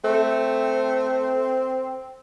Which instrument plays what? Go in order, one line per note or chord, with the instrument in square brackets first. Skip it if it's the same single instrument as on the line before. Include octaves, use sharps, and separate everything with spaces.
[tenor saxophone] A3 [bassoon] C4